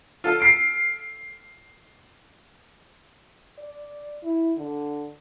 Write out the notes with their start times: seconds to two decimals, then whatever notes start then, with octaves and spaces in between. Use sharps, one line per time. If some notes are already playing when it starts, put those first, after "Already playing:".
0.24 F4 A4 F5
0.40 B6 C7 D7
3.58 D5
4.23 E4
4.57 D3